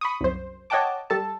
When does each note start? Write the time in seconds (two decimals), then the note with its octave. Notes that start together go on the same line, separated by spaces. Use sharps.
0.01 B5 C#6 D#6
0.21 C2 F#2 C5
0.70 C#5 D#5 F#5 G5 A5 D6
1.10 G3 A4 A5